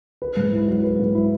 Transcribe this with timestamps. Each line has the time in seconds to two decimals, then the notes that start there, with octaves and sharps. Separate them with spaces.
0.22 B4
0.37 G#2
0.52 E4
0.68 F#3
0.84 B4
0.99 G#2
1.15 E4